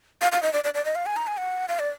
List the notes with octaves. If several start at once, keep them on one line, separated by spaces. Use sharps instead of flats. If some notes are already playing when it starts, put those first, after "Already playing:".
F5
F5
D#5
D5
D5
D5
D#5
F5
G#5
A#5
G#5
F#5
F5
D5